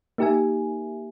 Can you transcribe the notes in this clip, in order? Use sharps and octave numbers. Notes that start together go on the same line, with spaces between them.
A#3 D#4 G4 A#4 E5 G#5